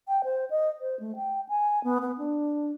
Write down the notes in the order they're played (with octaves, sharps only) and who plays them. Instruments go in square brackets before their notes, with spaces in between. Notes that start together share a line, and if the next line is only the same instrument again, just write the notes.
[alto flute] G5
C5
D#5
C5
A3
G5
G#5
B3
B3
D4